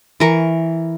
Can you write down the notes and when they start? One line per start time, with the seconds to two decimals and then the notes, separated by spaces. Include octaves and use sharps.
0.20 E3 A#4 C#6